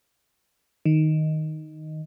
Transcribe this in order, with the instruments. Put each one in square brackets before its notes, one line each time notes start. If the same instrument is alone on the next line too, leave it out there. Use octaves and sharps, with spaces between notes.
[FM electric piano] D#3